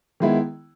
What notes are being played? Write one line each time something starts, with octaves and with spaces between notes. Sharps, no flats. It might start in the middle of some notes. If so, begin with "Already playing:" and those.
D#3 G#3 B3 E4